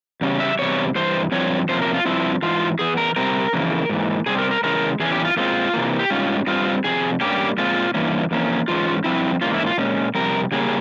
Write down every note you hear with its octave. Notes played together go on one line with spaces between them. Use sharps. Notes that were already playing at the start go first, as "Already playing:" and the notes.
E2 C#3 G3 C#4
E5
E2 C3 G3 C#5
G2 E3 C5
G2 F3 C4 C#5
C3 F3 A#3 C#4 C5
A#4
F4
G2 F3 C4 E4
G#2 E3 F4
E2 E3 G#4
A#4
C3 G3 C4 A#4
F2 C#3 E3 A#3
G#2 E3 A#3
C3 G3 C4 G#4
A#4
A#4
C#3 E3 G#3 A#4
E2 E3 C#4 G#4
G4
F4
A#2 G#3 C4 F4
C3 E3 A#3
G4
G#2 G3 C#4 F4
G2 G3 C4 F4
F2 C3 G#4
G2 G3 A#3 C#4 G4
A#2 G#3 C4 F4
G2 E3 A#3 C#4
F2 E3 A#3 C#4
G#2 E3 G#3 C#4 F4
G2 F3 C4 E4
G#2 E3 A#3 C#4 F4
E4
F4
A#2 G#3 C#4
F2 C3 G3 A#4
C#3 G3 A#3 C#4 G#4